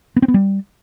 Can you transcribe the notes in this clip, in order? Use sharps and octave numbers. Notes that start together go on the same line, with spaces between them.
B3
C4
B3
G3